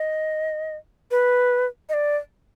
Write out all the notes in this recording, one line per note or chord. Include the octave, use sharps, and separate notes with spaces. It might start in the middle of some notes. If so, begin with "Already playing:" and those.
Already playing: D#5
B4
D#5
D5